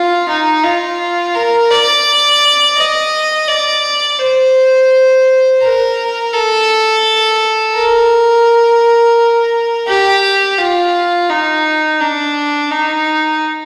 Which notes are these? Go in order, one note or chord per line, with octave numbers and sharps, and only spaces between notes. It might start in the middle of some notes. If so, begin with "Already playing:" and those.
Already playing: F4
D#4
F4
A#4
D5
D#5
D5
C5
A#4
A4
A#4
G4
F4
D#4
D4
D#4